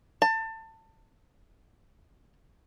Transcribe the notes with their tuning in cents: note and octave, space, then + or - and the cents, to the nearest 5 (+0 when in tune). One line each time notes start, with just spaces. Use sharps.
A5 +25